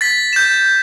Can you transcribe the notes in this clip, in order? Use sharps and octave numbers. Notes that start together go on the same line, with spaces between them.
A6 B6
G6 E7